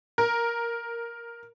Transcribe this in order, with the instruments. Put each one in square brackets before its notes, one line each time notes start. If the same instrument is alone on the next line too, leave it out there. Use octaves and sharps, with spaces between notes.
[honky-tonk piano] A#4